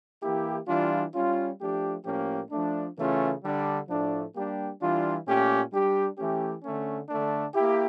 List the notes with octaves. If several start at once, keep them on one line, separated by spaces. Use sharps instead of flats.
E3 A#3 E4 G4
E3 G3 D4 F4
G3 C#4 F4
F3 A3 D4 G4
A2 F3 A#3 C#4 G4
F3 A3 D4
C#3 E3 A3 C#4 F4
D3 G3 D4
A2 F3 A3 D4
G3 A#3 D4 G4
E3 G3 D4 F4
A#2 A3 C#4 G4
G3 D4 G4
E3 A3 C#4 G4
D3 A3 C#4
D3 A3 D4
A#3 E4 G4